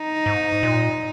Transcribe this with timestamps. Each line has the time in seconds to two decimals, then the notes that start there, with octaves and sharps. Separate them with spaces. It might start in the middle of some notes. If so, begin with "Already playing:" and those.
Already playing: D#4
0.26 G#2
0.63 A#2